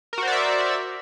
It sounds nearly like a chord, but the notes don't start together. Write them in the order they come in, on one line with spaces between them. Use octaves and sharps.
A#4 F#4 C5 D5 E5